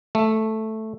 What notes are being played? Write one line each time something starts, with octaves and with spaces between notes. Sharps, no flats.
A3